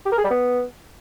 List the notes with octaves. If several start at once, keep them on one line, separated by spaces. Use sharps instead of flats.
G4
A#4
G#4
G3
B3